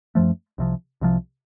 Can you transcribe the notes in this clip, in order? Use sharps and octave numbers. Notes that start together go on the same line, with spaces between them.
F#2 F3 A3
C2 C3 F3
C2 C3 F3